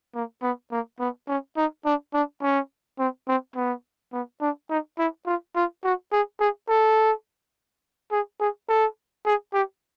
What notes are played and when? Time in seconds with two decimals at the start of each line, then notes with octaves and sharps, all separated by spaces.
0.15 A#3
0.42 B3
0.71 A#3
0.99 B3
1.28 C#4
1.57 D#4
1.85 D4
2.14 D4
2.42 C#4
2.99 C4
3.28 C4
3.56 B3
4.13 B3
4.41 D4
4.70 D#4
4.99 E4
5.26 F4
5.56 F4
5.84 F#4
6.12 G#4
6.40 G#4
6.69 A4
8.11 G#4
8.40 G#4
8.68 A4
9.26 G#4
9.54 G4